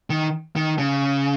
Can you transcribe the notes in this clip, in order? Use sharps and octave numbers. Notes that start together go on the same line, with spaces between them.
D#3
D#3
C#3